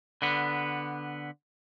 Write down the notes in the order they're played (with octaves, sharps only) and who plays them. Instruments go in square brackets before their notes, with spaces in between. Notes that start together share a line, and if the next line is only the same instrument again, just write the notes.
[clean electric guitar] D3 B3